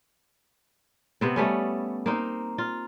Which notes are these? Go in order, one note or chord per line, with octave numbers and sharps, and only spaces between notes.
C3 B3 C4
G3 A3 B3 C#4
A#3 C4 D#4
F4